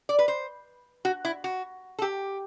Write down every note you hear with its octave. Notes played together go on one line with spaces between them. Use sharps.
D5
B4
C5
F#4
E4
F#4
A4
G4